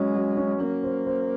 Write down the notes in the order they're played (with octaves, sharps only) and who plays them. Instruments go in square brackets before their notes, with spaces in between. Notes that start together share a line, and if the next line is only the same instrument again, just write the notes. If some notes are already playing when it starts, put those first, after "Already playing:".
Already playing: [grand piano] F#3 C#4 [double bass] G#3
[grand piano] F#3
C#4
[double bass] A#3 [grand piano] C#4
[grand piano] C5
C5